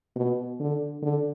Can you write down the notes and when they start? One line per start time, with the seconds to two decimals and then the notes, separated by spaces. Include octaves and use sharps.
0.15 B2
0.60 D3
1.02 D3